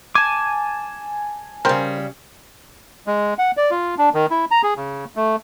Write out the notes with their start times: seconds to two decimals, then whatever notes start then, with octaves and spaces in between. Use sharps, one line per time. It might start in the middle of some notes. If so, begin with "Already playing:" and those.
0.15 G#5 A5 D6
1.65 C#3 G3 A#4 C5 G5
3.07 G#3
3.38 F#5
3.57 D5
3.71 F4
3.98 D4
4.14 D#3
4.30 E4
4.51 A#5
4.63 G#4
4.77 C#3
5.16 A3